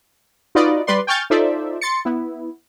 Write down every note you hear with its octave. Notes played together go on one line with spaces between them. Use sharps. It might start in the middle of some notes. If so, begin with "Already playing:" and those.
D#4 F4 F#4 B4 D5 D#5
G3 B4 D5 C6
G5 G#5 C#6 F6 G6 A6
D#4 F4 A4 C5 D5 E5
C6 A6 C#7
B3 E4